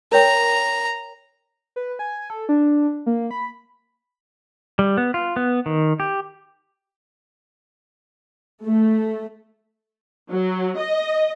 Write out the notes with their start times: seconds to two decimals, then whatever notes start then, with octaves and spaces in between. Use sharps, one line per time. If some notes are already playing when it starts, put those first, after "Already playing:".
0.12 A#4 C#5 G5 A#5
1.76 B4
1.99 G#5
2.30 A4
2.49 D4
3.06 A#3
3.31 B5
4.79 G3
4.98 B3
5.14 F4
5.36 B3
5.66 D#3
6.00 G4
8.64 A3
10.30 F#3
10.78 D#5